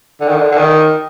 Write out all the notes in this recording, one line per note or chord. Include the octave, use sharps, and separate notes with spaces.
D3
D#3
D3
D3
D#3